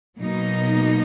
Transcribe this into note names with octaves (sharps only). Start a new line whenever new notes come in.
B2 F#3 A#3 D#4